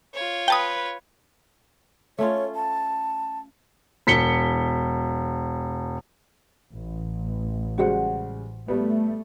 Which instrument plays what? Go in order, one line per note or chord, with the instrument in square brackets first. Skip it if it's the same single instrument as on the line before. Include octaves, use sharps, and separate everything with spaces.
[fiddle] F4 C#5
[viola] B4 [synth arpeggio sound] G5 A5 D#6
[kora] A3 C#4 F4 [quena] C#5
[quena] A5
[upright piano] E1 B6 C#7 G7
[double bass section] A1
[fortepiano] C#3 G3 G#3 [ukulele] F#4 C5 F#5
[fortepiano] G3 B3 [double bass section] A3